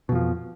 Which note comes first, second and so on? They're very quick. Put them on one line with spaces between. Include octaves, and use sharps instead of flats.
B2 F2 F3